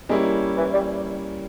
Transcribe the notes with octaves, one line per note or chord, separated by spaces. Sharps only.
G3 G#3 A#3 C#4 E4
E3
G3